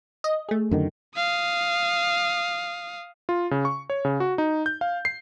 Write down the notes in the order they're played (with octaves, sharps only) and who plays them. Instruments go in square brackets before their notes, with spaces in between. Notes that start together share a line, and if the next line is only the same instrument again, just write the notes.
[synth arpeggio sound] D#5
A3 G#4
[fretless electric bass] F#2 D3 D#3
[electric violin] F5 D#6
[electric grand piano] F4
C#3
C#6
C#5
C#3
F#4
D#4
G6
F5
C7